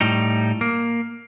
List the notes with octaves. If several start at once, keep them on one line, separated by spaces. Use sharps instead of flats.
A2 G3 D#4
A#3